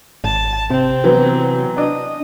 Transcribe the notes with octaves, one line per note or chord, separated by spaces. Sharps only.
G#1 A5
C3 C4
E3 F#3 B3
D4 D#5